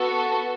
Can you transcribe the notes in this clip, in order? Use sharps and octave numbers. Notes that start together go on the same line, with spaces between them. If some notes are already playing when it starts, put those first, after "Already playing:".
Already playing: B3 F#4 A4